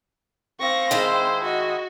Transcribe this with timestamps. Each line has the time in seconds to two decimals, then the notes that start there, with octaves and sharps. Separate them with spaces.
0.60 C4 F5 C#6 A#6
0.91 D#3 G#3 E4 C5
1.44 F#4 D#5